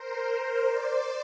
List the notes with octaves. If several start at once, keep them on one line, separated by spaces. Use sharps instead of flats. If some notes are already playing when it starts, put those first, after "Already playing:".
Already playing: A#4 C5
A#4 C5
C5 D5